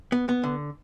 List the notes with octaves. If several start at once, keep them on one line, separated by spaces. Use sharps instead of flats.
B3
B3
D3